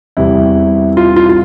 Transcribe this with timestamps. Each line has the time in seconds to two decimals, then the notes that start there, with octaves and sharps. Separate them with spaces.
0.17 E2 C3 E3 G3 E4
0.97 F4
1.16 F4
1.29 F4